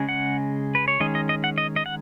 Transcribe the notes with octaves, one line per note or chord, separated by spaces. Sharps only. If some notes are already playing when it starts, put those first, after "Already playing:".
Already playing: C#3 G#3 C#4
F#5
B4
C#5
D#3 G#3 C#4 D#5
D#5
D#5
F#5
D#5
D#5
F#5